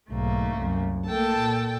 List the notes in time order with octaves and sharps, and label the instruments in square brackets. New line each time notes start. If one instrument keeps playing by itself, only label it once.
[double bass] B1 G#2 [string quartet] A3 A#3
[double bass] C2 F#2
[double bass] A3 A#3 [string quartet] A4 G5 A5
[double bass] A#2